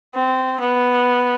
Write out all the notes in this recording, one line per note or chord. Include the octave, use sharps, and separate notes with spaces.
C4
B3